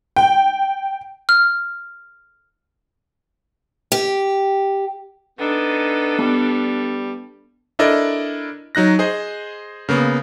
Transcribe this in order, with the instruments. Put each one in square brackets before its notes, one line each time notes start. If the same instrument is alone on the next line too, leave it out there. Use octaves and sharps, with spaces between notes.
[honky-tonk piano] G5
[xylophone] F6
[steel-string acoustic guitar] G4
[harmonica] B3 D#4 [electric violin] D4 A4
[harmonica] G3 [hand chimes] B3 A5
[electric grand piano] D4 E4 A4 A#4 D5 D#5
F#3 D#4 F#6 A#6
G#4 C5 D#5
C#3 A#3 B3